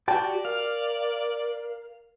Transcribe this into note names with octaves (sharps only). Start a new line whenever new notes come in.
F#4 G4 D5 G5 A5
A#4 F5